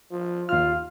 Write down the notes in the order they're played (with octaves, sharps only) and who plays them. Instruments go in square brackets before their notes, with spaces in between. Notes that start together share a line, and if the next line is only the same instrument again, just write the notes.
[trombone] F3
[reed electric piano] D#2 F6 [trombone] F4 [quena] F5